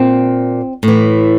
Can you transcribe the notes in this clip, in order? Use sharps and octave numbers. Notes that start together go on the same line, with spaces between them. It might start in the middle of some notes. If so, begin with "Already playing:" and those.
Already playing: A#2 C4
A2
E3